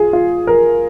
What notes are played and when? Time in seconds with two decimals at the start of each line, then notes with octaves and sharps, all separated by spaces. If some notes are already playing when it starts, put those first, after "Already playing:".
Already playing: F4 G#4
0.13 F4
0.47 A#4